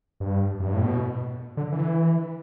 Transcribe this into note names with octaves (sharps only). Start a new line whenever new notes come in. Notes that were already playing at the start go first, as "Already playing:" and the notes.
G2
F#2
G2
A2
B2
D3
E3